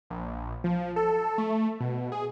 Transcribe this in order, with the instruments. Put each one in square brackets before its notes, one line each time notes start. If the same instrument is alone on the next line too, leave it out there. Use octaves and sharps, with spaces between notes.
[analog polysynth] A#1
F3
A4
A3
B2
G#4